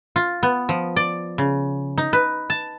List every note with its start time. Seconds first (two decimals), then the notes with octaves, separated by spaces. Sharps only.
0.16 F4
0.43 B3
0.69 F3
0.96 D5
1.38 C#3
1.98 D#4
2.13 B4
2.50 A5